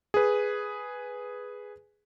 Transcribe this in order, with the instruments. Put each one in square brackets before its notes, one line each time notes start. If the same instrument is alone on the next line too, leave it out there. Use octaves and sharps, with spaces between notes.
[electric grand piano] G#4 B4